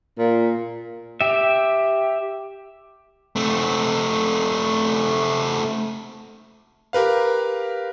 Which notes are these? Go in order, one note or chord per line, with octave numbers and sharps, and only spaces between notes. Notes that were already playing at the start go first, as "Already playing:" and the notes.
A#2
G4 E5
A3 C4
G4 A#4 B4 F5